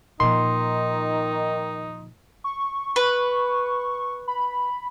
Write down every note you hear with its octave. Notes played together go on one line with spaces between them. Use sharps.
A#2 D#3 F3 D#4 C6
C#6
B4
B5